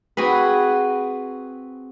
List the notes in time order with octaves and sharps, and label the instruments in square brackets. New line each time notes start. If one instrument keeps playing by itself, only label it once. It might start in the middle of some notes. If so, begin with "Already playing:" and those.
[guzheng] C4 F#4 G#4 B4